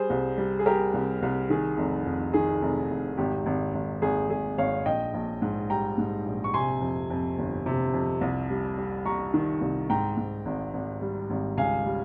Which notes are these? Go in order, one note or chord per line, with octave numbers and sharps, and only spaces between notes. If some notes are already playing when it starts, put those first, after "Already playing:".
Already playing: G3 G#4 C5
C2
G3
G#4
G3 G4 A#4
C2
C2
D#3 G#4
F1
F2
D#3 G#4
F1
F1
G#1 G4
G#1
G#1
G#1 G#4
G#1 G#4
G#1 C#5 F5
A#1 D#5 G5
A#1
G#2
G3 G5 A#5
G#2
A#1
C#6
C3 G#5 C6
F2
F2
G1
C3
F2
C2
G3
G3
G3 A#5 C#6
D#3
C2
G#2 G5 A#5
G#2
G#1
G#1
G3
G#1
C#2 F5 G#5
G3